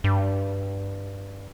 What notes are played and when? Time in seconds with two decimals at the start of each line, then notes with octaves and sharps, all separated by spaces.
0.04 G2